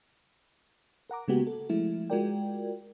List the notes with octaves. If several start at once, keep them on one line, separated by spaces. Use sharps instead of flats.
A#4 F#5 A#5 D6
C#3 G#3 A#3 B3 F#4 G4
A4
F3 G#3 A3 E4
G#3 F4 F#4 A#4 D5 G5